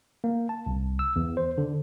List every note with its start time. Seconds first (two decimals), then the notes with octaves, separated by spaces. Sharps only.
0.24 A#3
0.49 A5
0.66 C2
0.99 E6
1.16 E2
1.37 C5
1.58 D3